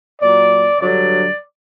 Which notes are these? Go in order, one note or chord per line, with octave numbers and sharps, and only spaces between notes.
A#2 F#3 D5
G2 D3 F#3 D5